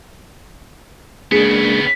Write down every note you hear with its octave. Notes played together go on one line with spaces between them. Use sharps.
C#3 G#3 A#3 B3 D4 G#4